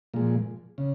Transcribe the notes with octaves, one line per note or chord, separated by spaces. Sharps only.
A#2 F3 G#3
C#3